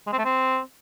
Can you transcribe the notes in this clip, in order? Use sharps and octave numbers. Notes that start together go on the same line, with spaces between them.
G#3
C4
A3
C4